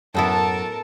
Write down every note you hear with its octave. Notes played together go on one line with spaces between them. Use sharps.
F#2 A2 B3 E4 F#4 A4 A#4 A5